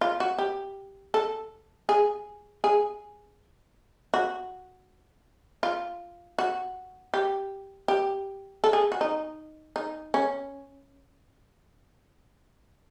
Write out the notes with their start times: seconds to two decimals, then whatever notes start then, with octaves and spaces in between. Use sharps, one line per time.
0.01 F4
0.20 F#4
0.39 G4
1.14 A4
1.89 G#4
2.64 G#4
4.14 F#4
5.63 F4
6.39 F#4
7.14 G4
7.88 G4
8.64 A4
8.73 G#4
8.92 F#4
9.01 D#4
9.76 D#4
10.14 C#4